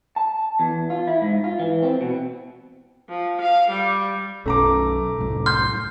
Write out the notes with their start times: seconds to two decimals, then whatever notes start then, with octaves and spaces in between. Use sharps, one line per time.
0.16 A5
0.60 E2
0.90 F4
1.07 E4
1.22 G#2
1.44 F4
1.59 E3
1.82 C4
2.01 B2
3.09 F3
3.41 F5
3.70 G3
4.46 B1 F#2 A3 C#4 A#5 D6
5.18 C2 F#2 A2
5.46 C6 F6 G6